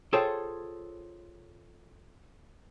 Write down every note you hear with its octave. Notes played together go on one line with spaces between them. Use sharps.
F4 G#4 A4 C5 C#5 G5